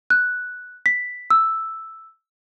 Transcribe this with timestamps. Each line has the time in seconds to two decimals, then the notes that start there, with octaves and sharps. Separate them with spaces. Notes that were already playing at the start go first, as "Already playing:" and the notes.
0.10 F#6
0.86 B6
1.30 E6